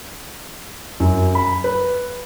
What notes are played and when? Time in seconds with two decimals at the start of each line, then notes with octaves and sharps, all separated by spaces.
1.00 F#2
1.35 B5
1.64 B4